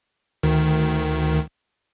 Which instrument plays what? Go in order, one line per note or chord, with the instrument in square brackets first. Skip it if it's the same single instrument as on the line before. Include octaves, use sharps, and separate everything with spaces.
[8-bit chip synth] D2 D#3